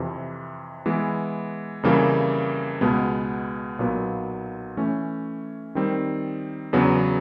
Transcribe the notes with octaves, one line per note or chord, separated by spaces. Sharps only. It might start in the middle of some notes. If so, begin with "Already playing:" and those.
Already playing: F2 C3 E3
E3 G#3 B3
F2 C#3 E3 G3 A#3
C#2 B2 G#3 B3
B1 A#2 F#3 B3
E3 A3 C#4
D#3 G3 C4
E2 C#3 F#3 B3 D4